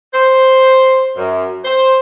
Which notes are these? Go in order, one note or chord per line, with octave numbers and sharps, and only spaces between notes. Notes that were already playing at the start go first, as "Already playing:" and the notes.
C5
F#2
C5